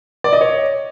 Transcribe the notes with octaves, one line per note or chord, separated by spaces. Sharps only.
D5
D#5
C#5